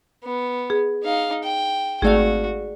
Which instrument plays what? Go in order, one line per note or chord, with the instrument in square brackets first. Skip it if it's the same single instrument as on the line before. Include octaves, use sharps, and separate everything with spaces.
[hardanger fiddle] B3
[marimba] G#4
[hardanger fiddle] D#4 F5
G5
[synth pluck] G#1 A3 F5 [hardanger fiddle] F#4 [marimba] G#4 D5